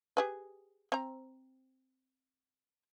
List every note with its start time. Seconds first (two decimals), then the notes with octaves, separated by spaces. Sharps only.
0.17 G4 G#4 B4
0.92 C4 A#5